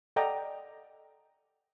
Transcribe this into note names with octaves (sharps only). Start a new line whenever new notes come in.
A4 D5 D#5 F#5 G5 A#5